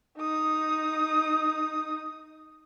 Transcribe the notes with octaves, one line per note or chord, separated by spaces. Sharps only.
D#4 D#6